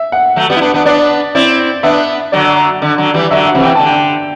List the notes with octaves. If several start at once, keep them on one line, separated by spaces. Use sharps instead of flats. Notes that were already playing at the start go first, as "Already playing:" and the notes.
Already playing: E5
F#5
F#3 A3
G3 B3
E4
B3 D4
B3 D4
B3 D4 D5
C4 E4 D5
B3 D4 E5
D3 F#3 D5
D3
D3 F#3
E3 G3
D3 F#3 E5
F#5
C3 E3
G5
D3 A5
G5